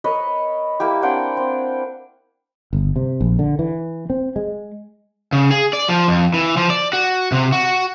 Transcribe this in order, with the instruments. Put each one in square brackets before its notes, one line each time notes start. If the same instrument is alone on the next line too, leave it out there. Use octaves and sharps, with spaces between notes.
[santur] A#4 B4 C#5 D#5
A#3 E4 G4
C4 D4 F#5 G5
C4
[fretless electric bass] G1
C3
A#1
D3
E3
C4
G#3
[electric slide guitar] C#3
G#4
D5
F3
F2
E3
F3
D5
F#4
C3
F#4